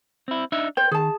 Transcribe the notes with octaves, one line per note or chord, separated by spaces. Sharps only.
C4 E4
D4 D#4 E5
C5 G5
D#3 G#4 A5